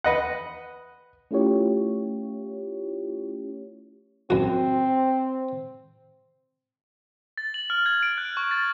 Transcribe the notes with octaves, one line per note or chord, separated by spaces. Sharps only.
B4 D#5 F#5
A3 C#4 E4 F4 G4 C#5
F#2 C4 F#4
A6
F#7
F6
G#6
D7
F#6
C#6
A6